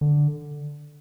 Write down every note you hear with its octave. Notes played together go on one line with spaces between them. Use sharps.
D3